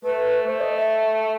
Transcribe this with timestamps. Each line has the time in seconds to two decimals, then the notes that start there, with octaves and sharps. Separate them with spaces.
0.04 A3 B4
0.46 A3 C5
0.61 D#5
0.75 E5